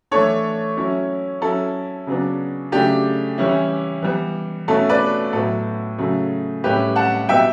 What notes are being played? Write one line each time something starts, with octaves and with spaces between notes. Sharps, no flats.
E3 A3 D4 A4 C#5
F#3 C#4 E4
F#3 C#4 E4 A4
C#3 F#3 B3 D4
C#3 F#3 A3 D4 G4
E3 G3 C#4 E4
E3 G3 B3
B2 A3 C#4 E4 A4
B4 D5
A2 F#3 B3 E4 A4
C#3 F#3 A3
A2 G3 C#4 E4 G4 B4
F#5 A5
B2 G3 B3 E4 E5 G5